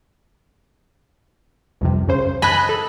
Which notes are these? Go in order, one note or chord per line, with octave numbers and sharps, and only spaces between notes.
C2 F2 C3
F#2 C#3 C5
D#5 G#5 A5 B5 F#6
A4